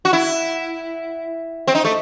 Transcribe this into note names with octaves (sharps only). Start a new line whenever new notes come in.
F#4
E4
C4
D#4
A3